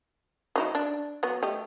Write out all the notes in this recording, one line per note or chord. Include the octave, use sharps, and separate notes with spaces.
F#3 D#4 E4
D4
F#3 B3
A3 G4 D#5